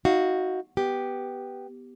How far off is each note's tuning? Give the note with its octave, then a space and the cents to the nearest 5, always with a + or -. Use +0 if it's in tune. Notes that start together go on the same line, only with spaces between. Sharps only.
D#4 +30 F#4 +0 F5 +0
B3 +0 G4 +0